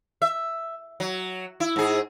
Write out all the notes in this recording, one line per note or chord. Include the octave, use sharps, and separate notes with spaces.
E5
F#3
E4
G#2 G#4